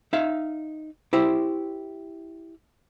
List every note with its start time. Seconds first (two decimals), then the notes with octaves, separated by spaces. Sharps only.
0.13 D#4 E5 F5
1.13 E4 G4 C5